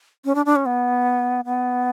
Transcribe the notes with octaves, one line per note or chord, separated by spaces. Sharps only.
C#4
D4
D4
C#4
B3
B3